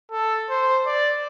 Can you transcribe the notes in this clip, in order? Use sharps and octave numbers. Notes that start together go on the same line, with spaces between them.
A4
C5
D5